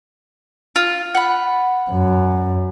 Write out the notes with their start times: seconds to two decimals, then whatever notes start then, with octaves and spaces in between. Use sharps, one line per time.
0.76 F4
1.15 F#5 B5
1.90 F#2